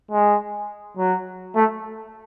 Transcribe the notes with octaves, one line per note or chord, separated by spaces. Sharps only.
G#3
F#3
A3